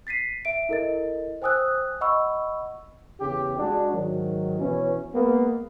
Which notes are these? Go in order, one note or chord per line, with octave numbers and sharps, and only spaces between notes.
A6 B6 C7 D#7
E5 D7
E4 A4 A#4 D#5 A6
C5 G5 G#5 D#6 E6 F#6
D#5 F#5 B5 C#6 E6
E2 C#3 G4
G#3 D4 F#4
G#2 D#3 F#3
B2 E3 C#4
G#3 A#3 B3